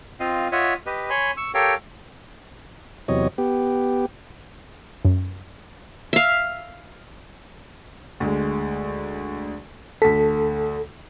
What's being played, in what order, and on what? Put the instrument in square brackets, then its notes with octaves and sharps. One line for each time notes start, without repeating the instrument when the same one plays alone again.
[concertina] C4 F4 D#5 F5
F4 C#5 D#5 E5 F#5
G4 B4 D#5
C#5 G#5 B5 C6
C#6 E6
G4 A4 A#4 C#5 F5 G5
[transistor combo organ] E2 C3 F#3 C#5 D#5
B3 G4
[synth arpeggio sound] F#2
[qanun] E5 F5
[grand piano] D2 G#3
[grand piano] D2 B6 [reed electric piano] A4